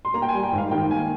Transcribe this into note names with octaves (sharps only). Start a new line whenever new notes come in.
C6
A#3 A#5
G5
G#5
G3
G5
G#2
F5
D#3 G5
A#3 G#5